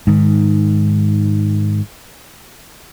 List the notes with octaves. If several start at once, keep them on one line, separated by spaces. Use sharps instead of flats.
G#2 D#3